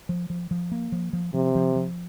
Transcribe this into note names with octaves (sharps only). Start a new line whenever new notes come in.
F3
F3
F3
A#3
F3
F3
C3 F3
F3
F3